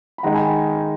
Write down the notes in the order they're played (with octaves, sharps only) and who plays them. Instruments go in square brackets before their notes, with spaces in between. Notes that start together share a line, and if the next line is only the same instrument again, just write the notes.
[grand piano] B5
D#3 G#3 D#4 F#5 A#5
G#5 B5